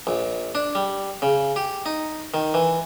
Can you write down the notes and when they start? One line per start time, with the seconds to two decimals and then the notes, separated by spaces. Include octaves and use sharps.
0.07 A#1
0.55 D4
0.75 G3
1.22 C#3
1.56 G4
1.86 D#4
2.34 D#3
2.54 E3